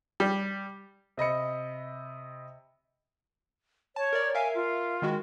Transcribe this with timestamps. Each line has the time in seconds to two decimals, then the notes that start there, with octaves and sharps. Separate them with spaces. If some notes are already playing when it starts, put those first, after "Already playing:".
0.20 G3
1.17 C3 D#5 B5 C#7
3.96 C#5 A5
4.13 A#4 D5
4.35 A#4 E5 F5 G#5
4.55 F4
5.02 D#3 G#3 F#4